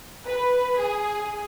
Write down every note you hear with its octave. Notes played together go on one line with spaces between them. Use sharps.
B4
G#4